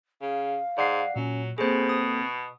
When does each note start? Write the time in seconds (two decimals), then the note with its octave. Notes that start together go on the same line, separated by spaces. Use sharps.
0.22 C#3 F5
0.78 G#2 D5 F#5 C7
1.16 A#2 F#3 C#4
1.58 B2 A#3 C4 G#4 A4 C5
1.89 D#6